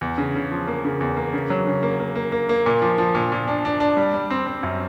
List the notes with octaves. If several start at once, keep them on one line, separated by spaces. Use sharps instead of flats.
E2
C#3
C#3
F3
A#3
C#3
E2
A#3
C#3
F#3
C#3
A#3
A#3
A#3
A#3
A#3
A#2
F3
F3
A#2
A#2
D4
D4
D4
G3
G3
C4
C4
F#2